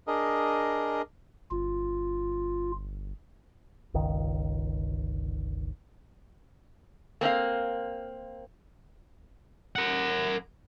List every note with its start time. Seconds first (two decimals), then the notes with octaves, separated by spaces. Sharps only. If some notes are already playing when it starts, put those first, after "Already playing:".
0.07 D4 G#4 A#4 D#5
1.51 G1 F4
3.94 G1 C#2 D#3
7.21 A#3 C4 D4 F5
9.76 A#4 F#5